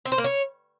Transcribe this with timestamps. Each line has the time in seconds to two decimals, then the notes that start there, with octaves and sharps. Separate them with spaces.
0.05 C4
0.12 C5
0.18 A#3
0.24 C#5